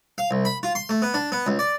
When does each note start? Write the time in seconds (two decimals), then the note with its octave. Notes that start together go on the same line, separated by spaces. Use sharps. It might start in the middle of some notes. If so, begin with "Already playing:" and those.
0.18 F5
0.31 C2
0.45 B5
0.63 F4
0.75 C6
0.89 A3
1.02 B3
1.14 D4
1.32 B3
1.47 C#2
1.59 D5